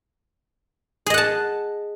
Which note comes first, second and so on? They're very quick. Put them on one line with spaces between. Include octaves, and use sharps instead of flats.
G#4 D#5 F#5 A5